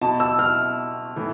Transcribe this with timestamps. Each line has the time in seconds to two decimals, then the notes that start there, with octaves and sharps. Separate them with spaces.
0.01 B2 A5
0.20 E6
0.39 F6
1.16 A2 E3